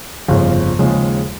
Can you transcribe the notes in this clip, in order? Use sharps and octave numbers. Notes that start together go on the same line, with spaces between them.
G1 F2 C#3 F3
D#2 C#3 F3 G#3